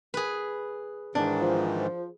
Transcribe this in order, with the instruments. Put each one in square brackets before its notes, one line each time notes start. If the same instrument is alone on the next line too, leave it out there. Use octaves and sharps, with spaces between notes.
[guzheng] G#4 B4
[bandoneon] G#2 D#3 E3 [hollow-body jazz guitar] D4
[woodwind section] F3